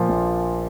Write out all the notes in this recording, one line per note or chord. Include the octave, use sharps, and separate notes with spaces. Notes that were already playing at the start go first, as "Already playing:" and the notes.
Already playing: A#2 F3
A#1